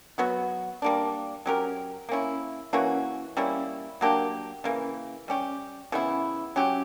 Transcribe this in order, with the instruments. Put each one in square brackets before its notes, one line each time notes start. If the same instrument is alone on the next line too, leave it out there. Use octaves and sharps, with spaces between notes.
[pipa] F#3 B3 F#4
G3 A#3 D4
F#3 C#4 G4 A#4
A#3 C#4 E4
E3 A#3 C#4 F#4
G3 A#3 C#4 E4
F#3 A#3 D4 G4
C#3 E3 A#3
G3 C#4 G4
C#3 E3 B3 E4
F#3 C#4 G4